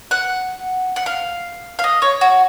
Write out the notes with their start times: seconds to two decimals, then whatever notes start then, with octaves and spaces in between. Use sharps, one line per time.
0.11 F#5
0.96 F#5
1.06 F5
1.79 F5
1.84 D#5
2.02 C#5
2.21 F#4